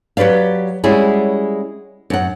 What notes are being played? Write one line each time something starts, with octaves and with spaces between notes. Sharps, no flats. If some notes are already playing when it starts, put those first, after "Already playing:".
F#3 G4 B4 D5 F5
G3 G#3 C#4 E4 F#4 G#4
F#2 F#5